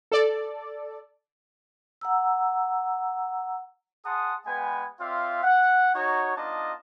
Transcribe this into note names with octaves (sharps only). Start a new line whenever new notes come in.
A4 D5
F#5 A#5 E6
G#4 F#5 A5 C6 D#6
G#3 B3 B4 G5 G#5
C4 F4 D5 E5 F5
F#5
D#4 F#4 C#5
B3 D4 D#4 F4 D#5 A5